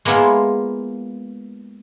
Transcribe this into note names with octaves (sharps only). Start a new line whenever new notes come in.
G#3 A#3 B3 E4 F4